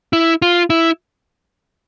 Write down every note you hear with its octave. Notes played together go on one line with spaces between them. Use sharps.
E4
F4
E4